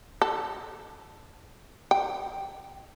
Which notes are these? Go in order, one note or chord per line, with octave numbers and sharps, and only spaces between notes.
A4
G5